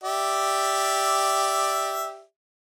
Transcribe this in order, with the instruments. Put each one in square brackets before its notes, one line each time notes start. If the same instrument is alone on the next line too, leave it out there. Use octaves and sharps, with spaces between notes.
[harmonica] G4 D5 E5